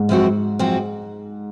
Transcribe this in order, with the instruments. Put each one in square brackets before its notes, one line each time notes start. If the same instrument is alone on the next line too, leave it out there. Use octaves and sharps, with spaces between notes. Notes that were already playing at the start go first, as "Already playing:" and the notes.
Already playing: [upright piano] G#2
[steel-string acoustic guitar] F#2 F3 C4 F#4
F#2 F3 C4 F#4